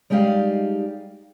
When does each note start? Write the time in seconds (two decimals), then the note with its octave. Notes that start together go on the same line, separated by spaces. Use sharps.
0.10 G3 G#3 D#4 G4 D5 F5